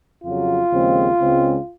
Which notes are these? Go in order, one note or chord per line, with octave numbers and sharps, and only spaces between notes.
F2 C#3 F#3 F4
D#2 C#3 F3 G#3 C4
C#2 C#3 G#3 C4